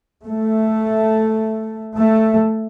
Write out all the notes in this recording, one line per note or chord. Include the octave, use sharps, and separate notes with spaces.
A3
A3